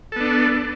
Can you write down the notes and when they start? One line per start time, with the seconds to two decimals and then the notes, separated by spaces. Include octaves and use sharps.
0.12 A4
0.16 B3
0.20 D4